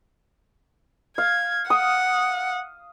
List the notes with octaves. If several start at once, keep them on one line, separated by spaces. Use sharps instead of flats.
F5 G#6
F#5 D#6